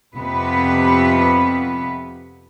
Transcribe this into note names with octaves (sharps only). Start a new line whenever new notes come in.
F2 C3 B3 B4